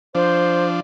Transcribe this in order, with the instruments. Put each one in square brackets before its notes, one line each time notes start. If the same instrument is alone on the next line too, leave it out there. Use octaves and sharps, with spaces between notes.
[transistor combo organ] F3 D4 [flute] C5